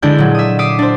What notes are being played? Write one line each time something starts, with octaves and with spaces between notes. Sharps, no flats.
D3 G#3 D4 E4 G6
A#2 F#3
E5 D#6
E5 D6 D#6 C7
D4 C5